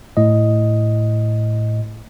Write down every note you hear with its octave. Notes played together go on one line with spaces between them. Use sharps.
A2 D#5